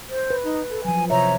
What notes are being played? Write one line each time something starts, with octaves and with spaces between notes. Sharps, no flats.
C5
B4
D#4
A4
F3 F#3 G#5
C3 C#5 E5 A#5